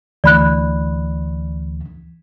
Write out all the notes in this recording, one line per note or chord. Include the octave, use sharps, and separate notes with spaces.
D2 E3 D5 B5 F#6